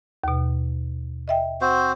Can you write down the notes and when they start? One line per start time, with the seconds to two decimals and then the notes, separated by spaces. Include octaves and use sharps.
0.24 D#2 B2
1.28 D#5 E5 G5
1.61 C4 F#4 C5